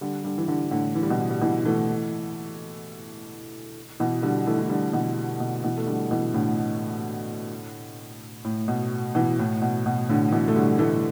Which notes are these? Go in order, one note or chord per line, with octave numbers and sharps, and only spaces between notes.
D3 G3
D3 G3
E3
D3 G3
A2 D3
E3
G3
B2 E3
G3
B2 E3
E3 A3
B2 E3
D3 G3
E3 A3
E3
D3 G3
B2 E3
B2
B2 E3
A3
D3 G3
B2 E3
A2 D3
A2
B2
B2 E3
A2
B2
B2
A2 D3
B2 E3
A3
D3 G3
E3 A3